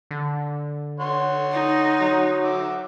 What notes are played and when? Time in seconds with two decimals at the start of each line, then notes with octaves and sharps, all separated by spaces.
0.11 D3
1.00 C#5 F#5 C6
1.52 D#4
2.00 F#3
2.44 E5 F#5 D6